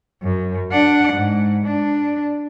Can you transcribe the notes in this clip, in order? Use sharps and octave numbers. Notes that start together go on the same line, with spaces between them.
F#2
D4 F#5
G#2
D4